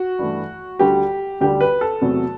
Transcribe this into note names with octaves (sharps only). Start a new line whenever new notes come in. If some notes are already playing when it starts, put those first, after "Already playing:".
Already playing: F#4
G2 E3 A3
D2 D3 G3 G4
D2 D3 G3 G4
B4
A4
E2 C3 F#3 A3